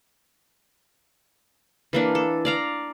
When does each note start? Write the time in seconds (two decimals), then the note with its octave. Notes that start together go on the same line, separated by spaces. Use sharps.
1.93 E3 A#3 D4
2.15 A4
2.45 D5 F5 A#5